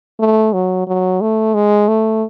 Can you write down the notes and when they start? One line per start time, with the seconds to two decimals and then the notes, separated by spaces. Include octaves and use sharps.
0.20 A3
0.53 F#3
0.87 F#3
1.21 A3
1.54 G#3
1.88 A3